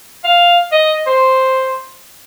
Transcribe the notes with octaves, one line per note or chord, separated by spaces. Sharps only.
F5
D#5
C5